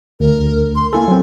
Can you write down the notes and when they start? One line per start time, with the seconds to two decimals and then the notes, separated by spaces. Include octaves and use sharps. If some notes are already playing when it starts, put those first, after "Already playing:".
0.20 D2 A#4
0.76 C6
0.93 A#3 E4 A4 G#5
1.08 F#3 C4